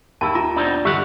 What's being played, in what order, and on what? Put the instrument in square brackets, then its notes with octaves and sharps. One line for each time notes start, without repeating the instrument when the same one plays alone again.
[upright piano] D#2 [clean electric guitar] E4 [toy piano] A5
[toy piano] F4 A#5
[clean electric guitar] B2 C4 D#4 [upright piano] D4
[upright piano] G2 D3 [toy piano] G4 [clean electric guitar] E5 F#5